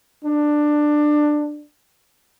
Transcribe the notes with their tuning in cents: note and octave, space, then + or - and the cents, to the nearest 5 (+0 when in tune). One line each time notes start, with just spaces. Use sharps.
D4 +15